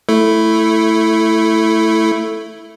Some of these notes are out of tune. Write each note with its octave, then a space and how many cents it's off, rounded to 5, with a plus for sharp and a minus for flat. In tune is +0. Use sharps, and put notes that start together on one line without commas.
A3 +5 E4 +0 A4 +0